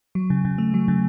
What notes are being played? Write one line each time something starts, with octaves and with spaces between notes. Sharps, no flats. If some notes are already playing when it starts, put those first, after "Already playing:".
F#3
C#3
C#3
A3
F#3
C#3